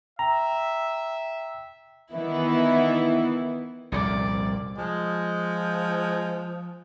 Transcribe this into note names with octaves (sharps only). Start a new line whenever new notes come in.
E5 G5 A#5
D#3 E3 B3 E4
C2 F2 A#2 D5
F3 G#3